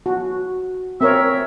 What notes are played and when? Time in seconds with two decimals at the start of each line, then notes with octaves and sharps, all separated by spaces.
0.06 F#4
1.01 C4 A#4 C#5 E5